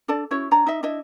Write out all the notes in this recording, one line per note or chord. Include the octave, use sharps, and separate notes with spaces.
D4 A4 D5 A5
C#4 E4 F#4 C#5
D4 C#5 A#5
D#4 D#5 E5
D4 E4 D#5 E5